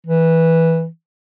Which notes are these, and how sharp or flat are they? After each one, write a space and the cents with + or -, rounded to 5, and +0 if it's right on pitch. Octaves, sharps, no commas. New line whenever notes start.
E3 -10